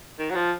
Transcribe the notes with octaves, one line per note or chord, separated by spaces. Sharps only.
D#3
F#3
F3